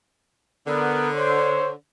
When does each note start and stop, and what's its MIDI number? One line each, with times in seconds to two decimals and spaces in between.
0.67 1.72 50
0.67 1.08 59
0.67 1.08 70
1.14 1.70 72
1.14 1.70 73